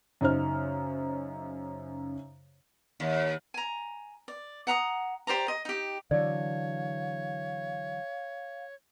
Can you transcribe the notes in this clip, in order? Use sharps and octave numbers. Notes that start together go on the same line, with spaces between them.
F#2 C#3 D#4 C5 F6
D#2
G#5 A#5
D5
F#5 A#5 B5 D#6
G4 C5 D5 A#5
D#5
D#4 G4
D3 E3 F#3 C#5 D5 F5